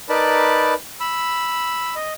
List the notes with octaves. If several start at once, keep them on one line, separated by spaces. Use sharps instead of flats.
D#4 A#4 B4 D5 A5 B5
B5 E6
D#5